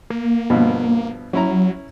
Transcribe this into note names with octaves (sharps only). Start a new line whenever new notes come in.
A#3
G2 B2 F3
F#3 C#4 E4 A#5